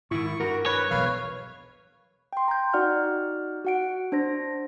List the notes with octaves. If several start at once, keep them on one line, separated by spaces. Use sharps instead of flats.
G#2 D#3 E4 C#6
G2 F#4 A#4
B4 C#5
E1 B1 B4 F5 F6
G5 C6
A#5 G6
D#4 F#4 D5 F#5 F6
F#4 F#5 D7
D4 C5 A#6